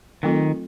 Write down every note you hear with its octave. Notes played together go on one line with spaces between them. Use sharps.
D#3 F#3 A3 C4 F4 A4